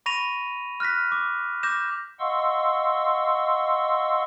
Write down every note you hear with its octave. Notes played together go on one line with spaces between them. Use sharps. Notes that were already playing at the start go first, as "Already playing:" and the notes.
B5 C#6 A#6 D#7 F7
F6 F#6 A#6 B6
D6
D6 G6 A#6 E7
D#5 F5 F#5 C6 C#6 E6